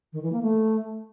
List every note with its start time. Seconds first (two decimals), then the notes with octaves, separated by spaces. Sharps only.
0.13 D#3
0.23 E3
0.32 A#3
0.42 A3